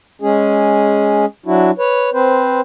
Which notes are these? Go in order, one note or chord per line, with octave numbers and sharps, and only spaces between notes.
G#3 C#4 G#4
F#3 D4 E4 F#4
B4 C#5
C4 B4 C5